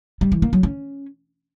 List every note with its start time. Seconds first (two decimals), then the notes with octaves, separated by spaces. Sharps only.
0.21 G3
0.32 E3
0.42 A#3
0.53 F#3
0.63 C#4